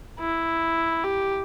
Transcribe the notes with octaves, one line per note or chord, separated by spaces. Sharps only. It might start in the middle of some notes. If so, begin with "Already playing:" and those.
E4
G4